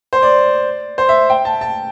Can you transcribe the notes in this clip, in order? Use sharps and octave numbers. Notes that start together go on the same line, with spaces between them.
C5
D5
C5
E5
G5
A5
A5